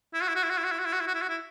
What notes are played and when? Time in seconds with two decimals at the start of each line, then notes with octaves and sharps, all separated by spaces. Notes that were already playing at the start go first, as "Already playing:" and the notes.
0.13 E4
0.21 F#4
0.28 E4
0.35 F#4
0.43 E4
0.50 F#4
0.58 E4
0.64 F#4
0.71 E4
0.79 F#4
0.86 E4
0.93 F#4
1.01 E4
1.07 F#4
1.14 E4
1.22 F#4
1.29 E4